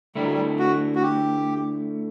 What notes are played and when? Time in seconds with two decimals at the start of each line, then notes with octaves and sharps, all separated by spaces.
0.15 D2 D3 G3 A3 E4
0.24 F#3
0.33 G3
0.59 F#4
0.95 F#4
1.02 G4